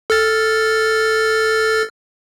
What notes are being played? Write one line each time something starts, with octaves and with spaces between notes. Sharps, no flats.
A4 F6 A6